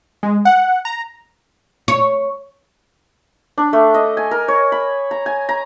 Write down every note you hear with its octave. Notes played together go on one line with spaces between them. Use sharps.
G#3
F#5
A#5
C#5
D4
A3
D#5
G#5
A#4
C#5
B5
A#5
G#5
A#5